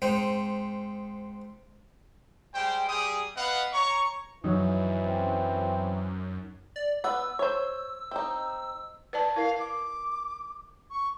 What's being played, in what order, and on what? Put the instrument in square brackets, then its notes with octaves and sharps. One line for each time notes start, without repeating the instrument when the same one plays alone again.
[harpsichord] G#2 C4 D#4
[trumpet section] G3 G#3 C5 G5
G3 G#4 D6 D#6
B3 B4 D#5 F5 F#5
C#5 A#5 C#6
[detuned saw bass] F#2 [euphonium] E3 [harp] F#3 D#4
[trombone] C4
[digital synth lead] D5
[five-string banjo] B3 F#5 [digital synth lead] E6
[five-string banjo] C5 C#5
C4 D#4
[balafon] B4 D5 A5
[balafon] E4 A#4 [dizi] F5
[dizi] D6
C#6